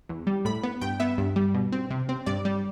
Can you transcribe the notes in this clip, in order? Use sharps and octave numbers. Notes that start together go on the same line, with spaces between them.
E2
G3
A2 B5
B3
G2 G5
B3 E5
G2
G3
B2
C4
C3
C4
G2 D5
G3